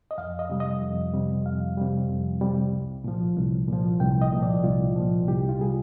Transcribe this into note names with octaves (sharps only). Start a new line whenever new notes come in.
D#5
F2 F5
D#5
C3 G3
D#5
F2
C3 G3
F2 F5
C3 G3
F2
C3 G3
C2
A#2 F3
C2
A#2 F3
C2 G5
D#5
A#2 F3
D5
C2 F4
A#2 F3
C2 G4
F4
C3 G3 G#4